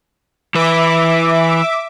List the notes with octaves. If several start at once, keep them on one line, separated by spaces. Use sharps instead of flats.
E3 B4 E5 D6